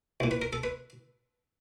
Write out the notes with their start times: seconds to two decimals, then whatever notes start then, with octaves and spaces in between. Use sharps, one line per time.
0.20 C2 A#2
0.31 B4
0.42 A#4
0.53 A4
0.64 B4